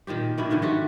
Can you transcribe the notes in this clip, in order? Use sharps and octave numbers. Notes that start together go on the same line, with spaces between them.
A#2 D#3 C4 G4
B2 D#3 D4 E4
G#2 D3 D#3 A3
A3 F#4 G4 C5